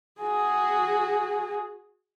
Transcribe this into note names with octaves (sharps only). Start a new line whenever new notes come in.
F#4 G#4